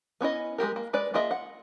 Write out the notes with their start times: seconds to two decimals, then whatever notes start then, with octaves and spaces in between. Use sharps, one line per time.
0.21 B3 C#4 E4 D#5
0.58 G#3 A#3 G4 A#4
0.76 A#3
0.93 G#3 B4 D5
1.14 A#3 F4 G#4 D#5 E5
1.31 F#5